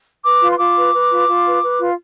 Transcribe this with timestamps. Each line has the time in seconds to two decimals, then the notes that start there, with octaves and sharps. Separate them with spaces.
0.24 B4 D6
0.41 F4
0.51 C6
0.59 F4 D6
0.76 B4
0.94 B4
1.10 F4
1.28 F4
1.45 B4
1.63 B4
1.80 F4